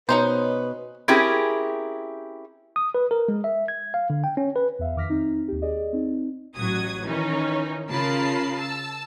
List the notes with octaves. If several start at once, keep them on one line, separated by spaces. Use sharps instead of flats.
B2 C#4 D#4 B4 C5
C4 C#4 E4 G4 G#4 A#4
D#6
B4
A#4
G#3
E5
G#6
F5
D3
G5
C#4
B4
E2 E5 F5
F2 D#3 D6 F6 A#6 B6
C4 D#4
D#2 G4
G#4 D5 D#5
C4 D#4
A1 F#3 F#4 D#6 G#6
D#3 E3 C#4 D#4
C#3 F4 A#4 A5 B5 C7
A5 E6